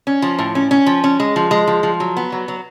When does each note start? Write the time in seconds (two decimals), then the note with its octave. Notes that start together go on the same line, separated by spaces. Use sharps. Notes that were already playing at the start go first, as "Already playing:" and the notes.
0.07 C#4
0.22 F3
0.39 A2
0.55 C#4
0.71 C#4
0.86 F3
1.04 C#4
1.20 G#3
1.36 F3
1.51 G#3
1.67 F3
1.83 F3
2.00 F#3
2.17 B3
2.32 F#3
2.48 F#3